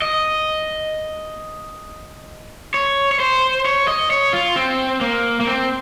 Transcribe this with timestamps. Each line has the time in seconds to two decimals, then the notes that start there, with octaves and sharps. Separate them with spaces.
0.02 D#5
2.74 C#5
3.12 C#5
3.20 C5
3.65 C#5
3.88 D#5
4.10 C#5
4.33 F4
4.56 C4
5.01 A#3
5.41 A#3
5.47 C4